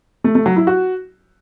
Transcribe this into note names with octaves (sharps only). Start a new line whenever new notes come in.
A3
A3
F#3
E4
F#4